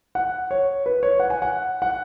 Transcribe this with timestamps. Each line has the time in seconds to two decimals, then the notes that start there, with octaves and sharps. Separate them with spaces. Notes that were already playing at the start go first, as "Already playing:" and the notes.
0.15 F#5
0.51 C#5
0.86 B4
1.03 C#5
1.20 F#5
1.30 G#5
1.42 F#5
1.82 F#5